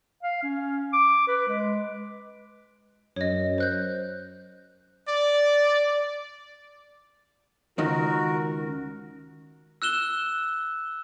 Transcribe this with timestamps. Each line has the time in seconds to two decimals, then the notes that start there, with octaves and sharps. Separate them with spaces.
0.23 F5
0.43 C#4
0.93 D6
1.28 B4
1.48 G#3
3.16 F#2 C#5 D#5
3.58 C5 F#6 G6
5.09 D5
7.78 C#2 D#3 F#4 A#4
9.82 E6 F#6 E7 G7